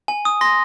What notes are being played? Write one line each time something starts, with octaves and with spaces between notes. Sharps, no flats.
G#5
D#6
C6 A#6